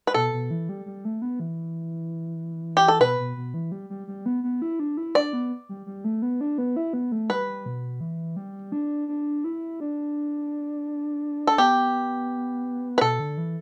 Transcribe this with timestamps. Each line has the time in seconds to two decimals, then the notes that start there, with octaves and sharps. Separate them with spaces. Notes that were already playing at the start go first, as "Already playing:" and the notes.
0.07 B4
0.14 B2 A4
0.33 B2
0.51 E3
0.69 G3
0.86 G3
1.05 A3
1.22 B3
1.40 E3
2.77 G4
2.88 A4
3.00 B2 B4
3.19 B2
3.37 B2
3.54 E3
3.72 G3
3.90 G3
4.07 G3
4.26 B3
4.44 B3
4.62 E4
4.80 D4
4.97 E4
5.15 D4 D5
5.33 B3
5.69 G3
5.86 G3
6.04 A3
6.22 B3
6.41 D4
6.58 B3
6.76 E4
6.93 B3
7.12 A3
7.30 G3 B4
7.66 B2
8.01 E3
8.36 G3
8.72 D4
9.08 D4
9.44 E4
9.80 D4
11.47 A4
11.58 B3 G4
12.98 B4
13.01 B2 A4
13.20 D3
13.38 E3